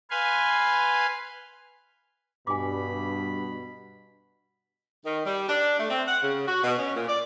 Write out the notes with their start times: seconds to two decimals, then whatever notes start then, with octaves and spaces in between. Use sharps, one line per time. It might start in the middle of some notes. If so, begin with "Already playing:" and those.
0.11 B4 F5 G#5 C6
2.47 G2 B2 G#5 B5 D6
5.05 D#3
5.25 G3
5.49 D4
5.78 A3
5.90 C4
6.07 F#5
6.22 C#3
6.47 F#4
6.63 B2
6.77 C#4
6.95 A#2
7.08 D5